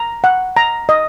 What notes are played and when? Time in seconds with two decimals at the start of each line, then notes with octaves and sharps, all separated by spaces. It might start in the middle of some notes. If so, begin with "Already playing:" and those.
Already playing: A#5
0.24 F#5
0.57 A#5
0.89 D#5